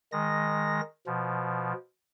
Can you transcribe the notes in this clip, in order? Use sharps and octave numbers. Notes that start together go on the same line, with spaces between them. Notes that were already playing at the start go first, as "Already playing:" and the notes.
D#3 G#3 A#6
B2 F3